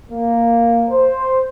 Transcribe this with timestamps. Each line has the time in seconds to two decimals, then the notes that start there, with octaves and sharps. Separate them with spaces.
0.10 A#3
0.89 C5